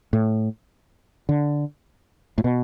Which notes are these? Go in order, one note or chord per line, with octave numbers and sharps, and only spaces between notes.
A2
D3
A2
B2